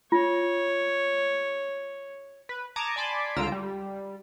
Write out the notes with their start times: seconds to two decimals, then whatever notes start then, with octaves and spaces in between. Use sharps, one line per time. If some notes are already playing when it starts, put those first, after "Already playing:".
0.12 F4 C#5
2.49 B4
2.76 A5 A#5 D6 D#6 G#6 C#7
2.96 D5 G#5 A5 B5 C6 D6
3.36 C#2 D3 F4 A#5 E6 D7
3.52 G3